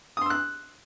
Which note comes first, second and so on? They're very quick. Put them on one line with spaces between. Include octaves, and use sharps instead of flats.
D#6 C6 E6 F#6